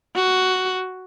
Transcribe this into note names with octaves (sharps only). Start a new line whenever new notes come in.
F#4